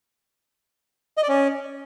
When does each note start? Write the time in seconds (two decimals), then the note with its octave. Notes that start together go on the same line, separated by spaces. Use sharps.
1.17 D#5
1.23 D5
1.29 C#4